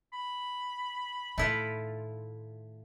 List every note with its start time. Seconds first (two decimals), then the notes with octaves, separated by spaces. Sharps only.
0.13 B5
1.38 A2 D#3 A3 E4 F4